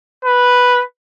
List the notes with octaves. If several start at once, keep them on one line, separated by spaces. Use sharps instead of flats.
B4